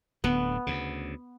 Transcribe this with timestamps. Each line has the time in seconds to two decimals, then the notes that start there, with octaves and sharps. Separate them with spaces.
0.24 D1 D3 B3
0.67 D2 C#3